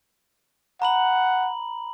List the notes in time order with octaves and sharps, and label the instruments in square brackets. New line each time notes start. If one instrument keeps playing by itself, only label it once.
[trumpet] F#5 [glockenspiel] A#5 B5 F#7